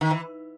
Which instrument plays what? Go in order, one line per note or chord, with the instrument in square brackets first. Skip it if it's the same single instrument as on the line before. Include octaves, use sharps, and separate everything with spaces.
[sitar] D#3
E3